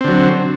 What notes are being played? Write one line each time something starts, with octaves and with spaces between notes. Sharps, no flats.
D3 F#3 C4